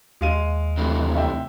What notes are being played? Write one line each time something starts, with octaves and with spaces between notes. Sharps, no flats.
D#2 G#3 F5 D#7
C3 E3 A3
E5 G5